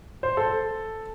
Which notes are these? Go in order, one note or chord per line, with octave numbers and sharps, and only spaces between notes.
C5
A4